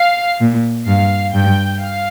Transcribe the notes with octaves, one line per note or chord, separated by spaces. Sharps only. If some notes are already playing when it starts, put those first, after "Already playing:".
Already playing: F5
A#2
G2 F5
G2 G5
F5